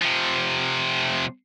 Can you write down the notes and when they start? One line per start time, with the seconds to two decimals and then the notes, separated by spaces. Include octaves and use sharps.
0.02 C3 F3